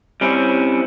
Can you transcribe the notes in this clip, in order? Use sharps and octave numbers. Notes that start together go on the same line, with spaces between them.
G3 C4 C#4 E4